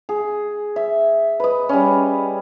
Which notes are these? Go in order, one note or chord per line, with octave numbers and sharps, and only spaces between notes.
G#4
E5
B4 D#5
G3 C#4